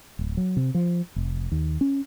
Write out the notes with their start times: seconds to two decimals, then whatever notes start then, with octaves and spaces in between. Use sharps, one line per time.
0.19 D1
0.37 F#3
0.57 C3
0.75 F3
1.16 F1
1.52 D#2
1.81 C#4